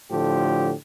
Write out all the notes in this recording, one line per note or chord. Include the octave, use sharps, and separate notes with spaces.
A2 D3 F3 G4